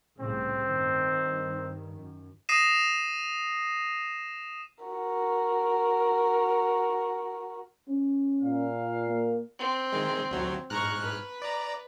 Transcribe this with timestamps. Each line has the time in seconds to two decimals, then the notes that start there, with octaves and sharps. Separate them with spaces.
0.20 C2 A2 C#3 C4
0.65 G2 D#3
1.94 F#2
2.49 D#6 A#6 C7 D#7 E7
4.84 F#4 A#4
7.88 C#4
8.41 A#2 F5
9.08 A#3
9.59 C4
9.93 D#3 G#3
10.31 D2 F#3
10.70 G#2 A#5 C#6 F6 F#6
11.02 B4
11.42 D5 A#5